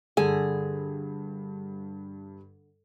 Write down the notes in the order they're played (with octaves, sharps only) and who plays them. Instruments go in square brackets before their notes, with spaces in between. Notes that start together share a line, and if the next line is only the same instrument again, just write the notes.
[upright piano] G2 [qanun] D3 [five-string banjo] G#4